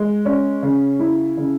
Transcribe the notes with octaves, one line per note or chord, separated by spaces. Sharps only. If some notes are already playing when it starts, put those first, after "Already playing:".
Already playing: G#3
C#4
C#3
E4
C#3